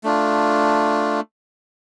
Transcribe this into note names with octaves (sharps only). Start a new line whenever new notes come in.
A3 D4 F4